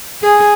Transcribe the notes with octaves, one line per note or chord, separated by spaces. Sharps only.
G#4